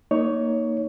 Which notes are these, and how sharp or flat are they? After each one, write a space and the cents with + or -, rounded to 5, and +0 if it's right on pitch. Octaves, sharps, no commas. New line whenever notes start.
A#3 +0 D#4 +0 C#5 +15